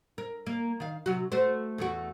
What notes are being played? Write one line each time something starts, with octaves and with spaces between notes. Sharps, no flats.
A#4
A#3
D#3 F5
C3 F#3 F#4
A3 F#4 C5
E2 A3 F#4